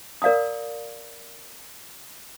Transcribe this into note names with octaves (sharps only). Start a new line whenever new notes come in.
A#4 D5 F5 A#5 D#6